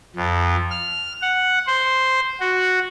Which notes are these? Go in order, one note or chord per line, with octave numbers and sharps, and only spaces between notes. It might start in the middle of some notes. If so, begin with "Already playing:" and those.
F2
F6
F#5
C5
F#4